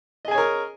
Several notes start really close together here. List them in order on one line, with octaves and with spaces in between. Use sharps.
D#5 G#4 G#5 C#5 A#4